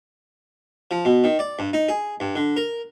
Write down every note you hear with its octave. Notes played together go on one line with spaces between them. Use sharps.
F3
B2
D#3
D5
G2
D#4
G#4
G2
D3
A#4